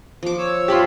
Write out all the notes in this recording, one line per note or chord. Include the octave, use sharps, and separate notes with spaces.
F3 D6
C#5 E6
F4 G4 A5 B5 C6